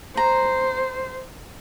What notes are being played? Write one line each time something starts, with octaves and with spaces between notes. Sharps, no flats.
C5 A#5